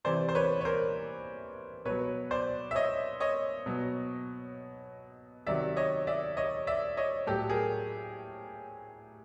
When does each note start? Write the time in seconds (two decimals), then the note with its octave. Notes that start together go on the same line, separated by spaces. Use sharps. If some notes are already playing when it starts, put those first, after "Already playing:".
0.04 C3 E3 C5 D5
0.29 C5
0.35 B4 C#5
0.61 C#5
0.65 A#4 C5
1.85 B2 F#3 B4 C#5
2.31 C5 D5
2.71 E5
2.75 C#5 D#5
3.20 C#5 D#5
3.66 B2 F#3
5.47 C3 D#3 F#3 D5 E5
5.77 C#5 D#5
6.07 D5 E5
6.37 C#5 D#5
6.67 D5 E5
6.97 C#5 D#5
7.27 A2 F#3 G4 A4
7.49 G#4 A#4